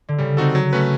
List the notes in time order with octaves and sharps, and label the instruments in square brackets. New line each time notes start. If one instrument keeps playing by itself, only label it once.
[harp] D3
[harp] C#3 [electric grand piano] G3
[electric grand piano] C4 D#4 F#4 A4
F#3
A3 C#4 F#4 B4